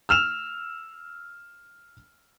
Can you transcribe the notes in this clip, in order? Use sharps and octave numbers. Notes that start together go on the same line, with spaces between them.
E6 F6 E7 F7